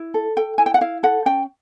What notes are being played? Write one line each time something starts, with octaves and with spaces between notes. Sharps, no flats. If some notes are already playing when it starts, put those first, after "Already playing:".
Already playing: E4
A4
A4 G5
E4 G#5
G5
F#5
E4 F5
A4 F#5
C#4 G5